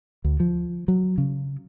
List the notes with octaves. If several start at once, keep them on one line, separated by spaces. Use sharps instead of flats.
D2
F3
F#3
C#3